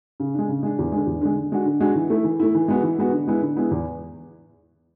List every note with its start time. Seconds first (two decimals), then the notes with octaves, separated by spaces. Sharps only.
0.20 C#3
0.34 G#3 D4
0.49 C#3
0.63 G#3 D4
0.79 E2
0.92 D3 G#3
1.07 E2
1.21 D3 G#3
1.37 D3
1.52 G#3 D4 F#4
1.65 D3
1.80 G#3 D4 F#4
1.95 E3
2.10 A3 E4
2.24 E3
2.40 A3 E4
2.55 E3
2.68 G#3 B3 F#4
2.83 E3
2.98 G#3 B3 F#4
3.13 D3
3.28 G#3 B3 E4
3.42 D3
3.56 G#3 B3 E4
3.71 E2